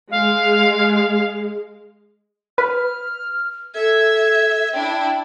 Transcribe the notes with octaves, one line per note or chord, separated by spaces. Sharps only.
G#3 F5
B4 F6
A4 E5 G#6
D4 E4 G5